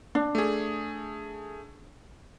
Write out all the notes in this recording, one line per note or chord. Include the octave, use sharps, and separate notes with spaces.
D4
A3 G#4